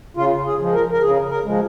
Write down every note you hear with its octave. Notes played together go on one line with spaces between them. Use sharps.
C#3 F4
G#4
F3 G#3
A#4
A#4
C#3 G#4
A#4
F3 G#3